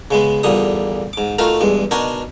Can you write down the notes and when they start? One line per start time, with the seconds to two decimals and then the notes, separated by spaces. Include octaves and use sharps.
0.11 C#3 G#3 B3
0.43 E2 A#2 D3 G3 D#6
1.13 G#2 D6
1.39 A3 D#4 F4 F#4 A#4
1.61 E2 G2 G#3
1.91 B2 D4 D#4 F#4 A#4 G#5